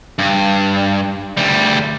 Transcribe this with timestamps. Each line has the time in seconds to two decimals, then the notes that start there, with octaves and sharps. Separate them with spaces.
0.19 G2
1.37 D2 G3